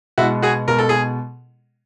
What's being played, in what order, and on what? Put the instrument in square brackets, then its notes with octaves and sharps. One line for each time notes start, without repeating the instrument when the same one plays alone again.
[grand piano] B2 G#3 B3 [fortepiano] E4 F#4
[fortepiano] F#4 G#4
[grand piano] B2 G#3 B3 [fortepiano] A#4
[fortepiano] A4
G#4